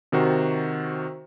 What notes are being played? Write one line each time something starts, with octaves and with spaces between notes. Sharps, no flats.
C3 D#3 F#4 C5